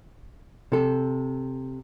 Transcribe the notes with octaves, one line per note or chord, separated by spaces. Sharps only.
C3 A4